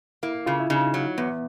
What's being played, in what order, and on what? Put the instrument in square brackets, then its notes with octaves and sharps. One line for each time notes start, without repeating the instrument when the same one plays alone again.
[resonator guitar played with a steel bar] A#3 [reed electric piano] E4
[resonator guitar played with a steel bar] C#3 [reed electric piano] F4
[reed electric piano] E4
[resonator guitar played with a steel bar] C#3 [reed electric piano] D#4
[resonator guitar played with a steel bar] F#3
[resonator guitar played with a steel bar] E2 [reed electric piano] B3